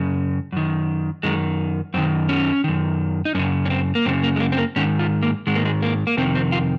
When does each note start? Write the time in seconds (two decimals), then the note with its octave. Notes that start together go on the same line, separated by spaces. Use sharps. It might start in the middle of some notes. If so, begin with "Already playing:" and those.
Already playing: F#2 C#3
0.52 F#2 D#3
1.23 F#2 D#3 G#3
1.94 F#2 D#3 C4
2.29 C#4
2.64 F#2 D#3
3.25 D#4
3.35 F#2 C#3 C#4
3.65 C#4
3.70 C4
3.95 A#3
4.05 F#2 C#3 C4
4.23 A#3
4.36 G#3
4.40 A#3
4.52 C4
4.58 A#3
4.76 G#2 D#3 C#4
4.99 F4
5.23 A#3
5.47 G#2 D#3 G#3
5.55 A#3
5.65 G#3
5.82 A#3
6.07 A#3
6.17 F2 C3 D#3 C4
6.35 C4
6.52 F4